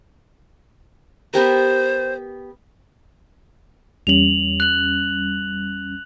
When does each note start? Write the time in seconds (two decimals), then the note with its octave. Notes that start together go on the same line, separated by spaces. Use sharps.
1.34 B3 G4 A#4 C5
4.07 E2 G3 C#4 F7 F#7
4.60 F#6 F#7